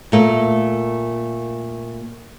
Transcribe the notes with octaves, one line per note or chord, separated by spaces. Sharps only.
A#2 A3 A#3